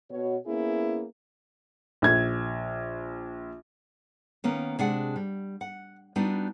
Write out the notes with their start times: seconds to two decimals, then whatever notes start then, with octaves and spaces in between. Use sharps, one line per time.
0.10 B2 F#4 C#5
0.46 A#3 B3 C#4 E4 G#4
2.02 A#1 G#6
4.44 D#3 A#3 B3 C#4
4.79 C3 G#3 D4 G#4 D5 F#5
5.16 G3
5.61 F#5
6.16 G3 B3 D4 D#4 F#4